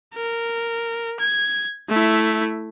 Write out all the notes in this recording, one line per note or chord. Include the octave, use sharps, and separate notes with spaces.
A#4
G#6
A3 E4